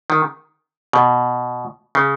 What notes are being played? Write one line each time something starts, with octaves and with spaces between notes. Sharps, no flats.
D#3
B2
C#3